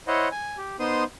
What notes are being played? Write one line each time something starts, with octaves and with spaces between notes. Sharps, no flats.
E4 C5 C#5 D#5 F#5
G#5
G4
B3 D#4 C5 C6 D#6